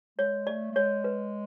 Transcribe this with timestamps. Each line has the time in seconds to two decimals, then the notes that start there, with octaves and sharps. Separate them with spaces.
0.18 G#3 C#5
0.47 A3 D5
0.72 A3
0.76 G#3 C#5
1.04 B4